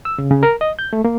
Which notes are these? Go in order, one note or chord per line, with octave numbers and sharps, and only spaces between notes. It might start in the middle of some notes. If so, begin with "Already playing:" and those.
E6
C#3
C#3
A#4
D#5
G6
A3
A#3